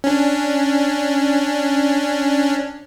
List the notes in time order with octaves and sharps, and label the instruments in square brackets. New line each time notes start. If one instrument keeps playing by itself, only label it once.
[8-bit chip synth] C#4 D4